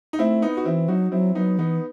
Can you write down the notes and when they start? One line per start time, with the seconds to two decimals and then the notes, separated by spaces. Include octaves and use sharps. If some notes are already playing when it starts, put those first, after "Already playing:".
0.13 D#4
0.19 A3 C4 E4
0.42 B3 D#4
0.57 F#4
0.65 E3 C4 E4
0.88 F#3 D#4 F#4
1.12 F#3 C4 E4
1.35 F#3 B3 D#4
1.59 E3 B3 D#4